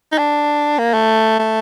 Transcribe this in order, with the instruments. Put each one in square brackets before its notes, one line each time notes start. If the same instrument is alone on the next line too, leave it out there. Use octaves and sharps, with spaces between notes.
[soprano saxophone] D#4
D4
A#3
A3
A3